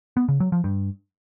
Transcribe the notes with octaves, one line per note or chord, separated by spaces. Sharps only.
B3
C#3
F#3
F3
G2